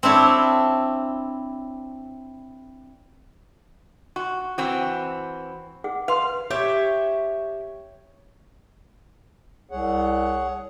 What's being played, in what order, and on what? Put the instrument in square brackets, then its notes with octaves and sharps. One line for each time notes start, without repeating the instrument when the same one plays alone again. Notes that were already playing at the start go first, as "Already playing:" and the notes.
[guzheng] C4 D4 E4 C#5
[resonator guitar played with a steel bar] F#4 [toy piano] C#6
[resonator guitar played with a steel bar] E3 C4 F#4
[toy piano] G#4 F#5
[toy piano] B4 C6 [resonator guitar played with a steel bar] F5
[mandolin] G4 [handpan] C#5 [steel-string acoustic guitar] E5
[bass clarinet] C2 [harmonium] G#4 C#5 F#5